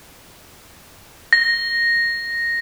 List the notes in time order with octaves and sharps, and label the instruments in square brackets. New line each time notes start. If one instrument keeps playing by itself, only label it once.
[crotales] A#6